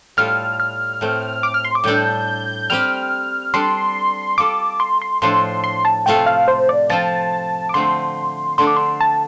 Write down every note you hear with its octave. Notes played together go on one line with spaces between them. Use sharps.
A2 G3 F4 A4 F6
F6
A2 A3 C4
D6
F6
C6
D6
A2 G3 D4 A4 G6
G3 C4 G4 F6
G3 D4 A4 C6
G3 F4 A4 D6
C6
C6
A2 F3 D4 A4 C6
C6
A5
C3 A3 F4 A4 G5
F5
C5
D5
F3 C4 F4 A5
D6
D3 F3 A3 C4 C6
D3 A3 D4 A4 C6
D6
C6
A5